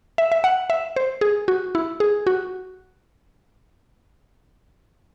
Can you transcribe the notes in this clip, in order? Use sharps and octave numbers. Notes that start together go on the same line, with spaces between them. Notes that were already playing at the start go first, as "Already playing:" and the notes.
E5
E5
F#5
E5
C5
G#4
F#4
E4
G#4
F#4